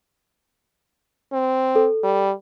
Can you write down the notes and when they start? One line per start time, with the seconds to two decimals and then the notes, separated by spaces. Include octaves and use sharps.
1.33 C4
1.76 A4
2.04 G3